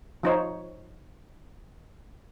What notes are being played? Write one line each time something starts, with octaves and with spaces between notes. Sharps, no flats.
F3 D#4 C5 C#5